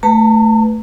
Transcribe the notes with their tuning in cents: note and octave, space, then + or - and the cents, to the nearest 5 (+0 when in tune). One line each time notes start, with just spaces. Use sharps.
A3 +0 B4 +0 A#5 -40